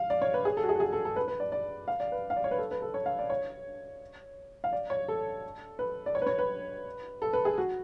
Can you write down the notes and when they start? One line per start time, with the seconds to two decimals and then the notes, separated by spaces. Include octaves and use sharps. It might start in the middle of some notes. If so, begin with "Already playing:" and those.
Already playing: F5
0.10 D5
0.22 C#5
0.34 B4
0.45 G#4
0.57 A4
0.63 F#4
0.69 G#4
0.75 F#4
0.80 G#4
0.93 A4
1.05 A4
1.16 B4
1.28 B4
1.40 D5
1.52 D5
1.88 F5
2.00 D5
2.12 B4
2.30 F5
2.37 D5
2.44 C#5
2.51 B4
2.58 A4
2.71 B4
2.82 A4
2.94 C#5
3.06 F5
3.19 D5
3.30 C#5
4.64 F5
4.73 D5
4.90 C#5
5.08 A4
5.79 B4
6.06 D5
6.15 C#5
6.22 B4
6.27 C#5
6.38 B4
7.22 A4
7.33 B4
7.45 G#4
7.58 F#4